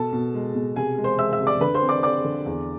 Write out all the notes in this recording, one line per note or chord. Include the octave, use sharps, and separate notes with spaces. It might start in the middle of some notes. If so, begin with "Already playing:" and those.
Already playing: B2 A4 A5
B2
G#3
B2
C3 G#4 G#5
G#3
C5 C6
G#3 E5 E6
E5 E6
C3
D5 D6
D3 B4 B5
C5 C6
C4
D5 D6
C4 D5 D6
D3
E2